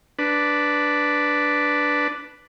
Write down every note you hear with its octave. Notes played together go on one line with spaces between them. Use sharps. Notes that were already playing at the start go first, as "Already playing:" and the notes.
D4 B4